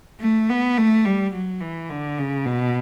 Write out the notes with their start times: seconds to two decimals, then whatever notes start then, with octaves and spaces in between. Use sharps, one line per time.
0.21 A3
0.49 B3
0.77 A3
1.05 G3
1.33 F#3
1.61 E3
1.90 D3
2.19 C#3
2.46 B2